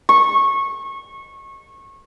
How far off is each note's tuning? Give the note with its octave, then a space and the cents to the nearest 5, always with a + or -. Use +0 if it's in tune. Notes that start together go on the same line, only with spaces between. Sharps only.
C#6 -25